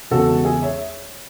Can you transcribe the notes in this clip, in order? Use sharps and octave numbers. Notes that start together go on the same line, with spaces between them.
E2 C#3 G#3 F#4 A4
G#4
C#5 E5